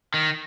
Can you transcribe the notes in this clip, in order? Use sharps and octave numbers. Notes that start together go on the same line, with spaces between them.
D#3